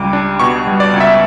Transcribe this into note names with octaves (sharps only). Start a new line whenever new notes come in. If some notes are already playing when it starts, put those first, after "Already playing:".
Already playing: C#2 G3 D6
D4
B2 C#6
G3
D5
C#2
E5